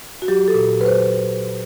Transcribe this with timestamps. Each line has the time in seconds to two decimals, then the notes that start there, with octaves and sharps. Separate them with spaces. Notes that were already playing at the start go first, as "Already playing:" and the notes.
0.22 F#4
0.28 F#3 G4
0.48 A4
0.54 A#2
0.80 F#3 B4
0.86 C5